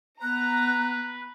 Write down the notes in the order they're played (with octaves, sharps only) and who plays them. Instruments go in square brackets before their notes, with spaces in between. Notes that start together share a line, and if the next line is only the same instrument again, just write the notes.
[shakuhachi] B3 [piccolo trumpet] B4 [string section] A#5 [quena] F#6